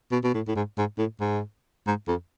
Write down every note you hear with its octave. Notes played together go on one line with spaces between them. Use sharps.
B2
B2
A2
A2
G#2
G#2
A2
G#2
G#2
F2